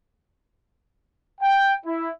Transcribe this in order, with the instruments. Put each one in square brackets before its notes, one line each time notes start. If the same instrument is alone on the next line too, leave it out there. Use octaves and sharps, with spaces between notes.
[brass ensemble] G5
E4